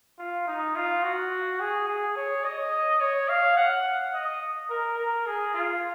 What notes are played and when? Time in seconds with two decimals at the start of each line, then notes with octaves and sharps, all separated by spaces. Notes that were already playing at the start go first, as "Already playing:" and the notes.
0.19 F4
0.47 D#4
0.75 F4
1.03 F#4
1.60 G#4
1.88 G#4
2.16 C#5
2.44 D#5
3.00 C#5
3.28 F5
3.57 F#5
4.14 D#5
4.70 A#4
4.98 A#4
5.26 G#4
5.54 F4